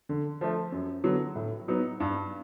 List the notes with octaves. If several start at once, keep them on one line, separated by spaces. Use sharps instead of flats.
D3
F3 A3
F#2
D3 F#3 B3
A2
F#3 B3 D#4
G2